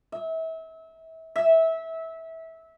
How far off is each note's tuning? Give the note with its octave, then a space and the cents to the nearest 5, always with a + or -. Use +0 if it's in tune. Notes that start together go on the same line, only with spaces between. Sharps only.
E5 -30
E5 -20